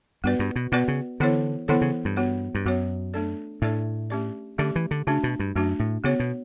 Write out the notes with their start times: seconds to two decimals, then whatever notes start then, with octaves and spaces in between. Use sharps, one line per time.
0.24 G2 B3 F#4 B4 D5
0.39 G2
0.56 B2
0.72 B2 B3 F#4 B4 D5
0.88 C#3
1.20 D3 E3 B3 E4 A4 C#5
1.68 D3 E3 B3 E4 A4 C#5
1.81 C#3
2.05 G2
2.17 B3 F#4 C#5
2.55 G2
2.66 F#2 B3 F#4 C#5
3.14 A3 D4 A4 D5
3.62 A2 A3 D4 A4 D5
4.10 A3 C#4 G4 D5
4.58 D3 A3 C#4 G4 D5
4.76 E3
4.91 D3
5.07 C#3 A3 D4 F#4
5.23 B2
5.40 G2
5.55 F#2 A3 D4 F#4
5.80 A2
6.04 C#3 B3 F#4 C#5
6.20 B2